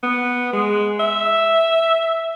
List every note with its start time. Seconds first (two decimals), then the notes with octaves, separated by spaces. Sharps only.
0.03 B3
0.53 G#3
1.00 E5